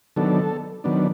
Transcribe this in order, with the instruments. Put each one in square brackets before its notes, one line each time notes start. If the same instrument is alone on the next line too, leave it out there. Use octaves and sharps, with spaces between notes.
[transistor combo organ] D#3 F#3 B3 D4 A4
D#3 F#3 B3 D4